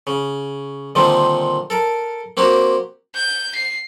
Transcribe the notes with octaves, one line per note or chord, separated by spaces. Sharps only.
C#3
A#2 D3 D#3 G3 C4
A4 A#4
A#3 C4 F#4 G4
G6
C7